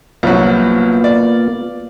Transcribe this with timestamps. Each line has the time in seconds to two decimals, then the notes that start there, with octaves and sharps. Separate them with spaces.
0.23 C2 F3 F#3 A#3 B3 F4
1.04 D5